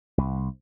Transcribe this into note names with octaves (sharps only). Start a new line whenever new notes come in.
C2